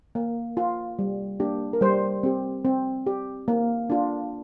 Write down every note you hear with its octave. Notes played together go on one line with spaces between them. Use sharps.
A#3
F4
G3
A#3 D4 G4
A#4
G3 C5
C4 G4
C4
G4
A#3
D4 F4